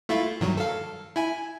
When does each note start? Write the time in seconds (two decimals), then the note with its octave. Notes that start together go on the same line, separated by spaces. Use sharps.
0.09 A3 E4 F4
0.41 G2 D#3 F#3
0.57 A4 F5
1.16 E4 G#5